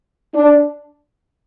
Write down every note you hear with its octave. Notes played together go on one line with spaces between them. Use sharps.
D4